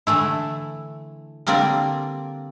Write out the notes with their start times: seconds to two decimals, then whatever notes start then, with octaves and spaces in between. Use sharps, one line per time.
0.07 D3 E3 A3 E4
1.47 D3 G3 A#3 C4 F4 D5